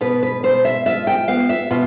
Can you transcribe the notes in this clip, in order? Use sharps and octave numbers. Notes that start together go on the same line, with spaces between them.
B2 B4
B4
B2 C5
E5
F4 E5
G5
B3 F5
E5
B2 F4